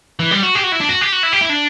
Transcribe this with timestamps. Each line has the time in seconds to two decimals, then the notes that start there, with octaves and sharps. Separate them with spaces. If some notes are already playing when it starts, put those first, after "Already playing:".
0.20 E3
0.31 G3
0.43 F#4
0.55 G4
0.63 F#4
0.72 E4
0.80 D4
0.89 F#4
1.01 G4
1.12 F#4
1.23 E4
1.33 G4
1.41 E4
1.50 D4